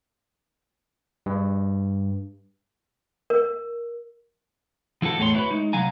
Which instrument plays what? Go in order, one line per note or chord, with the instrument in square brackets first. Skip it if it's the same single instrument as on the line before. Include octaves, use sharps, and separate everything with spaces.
[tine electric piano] G2
[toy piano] A#4
[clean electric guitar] F3 E4 F#4 A4
E2 A2 A3 G#4 C#5 C6
E4 F#4 B4 C#5
G#3 D#4
C2 F#3 F5 G#5 A#5